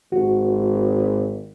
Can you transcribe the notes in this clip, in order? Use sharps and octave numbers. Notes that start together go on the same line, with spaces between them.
G#1 F#4